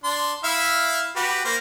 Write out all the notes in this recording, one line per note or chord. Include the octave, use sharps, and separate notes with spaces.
D4 C6
E4 E5 F5
F#4 G4 B4
A#3 C5